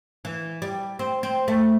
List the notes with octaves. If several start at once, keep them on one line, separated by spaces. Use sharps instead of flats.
E3
G3
C4
C4
A3